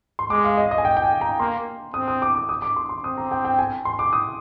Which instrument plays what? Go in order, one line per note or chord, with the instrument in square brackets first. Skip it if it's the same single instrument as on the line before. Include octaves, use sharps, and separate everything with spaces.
[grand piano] C6
[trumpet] G#3 [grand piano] D6
[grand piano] F5
D#5
D#5
G#5
G5
G5
G#5
A#5
[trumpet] A#3 [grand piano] C6
[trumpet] C4 [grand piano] D#6
[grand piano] D#6
D6
D6
D#6
D6
C6
C6
[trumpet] C4 [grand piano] D#6
[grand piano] A#5
G5
G5
G#5
C6
D6
D#6